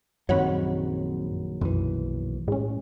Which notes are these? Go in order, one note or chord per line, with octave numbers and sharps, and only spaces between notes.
A#1 F#2 D#3 F#3 C4 C#5 F#5 B5
B1 F#2 E3
A2 G#3 C#4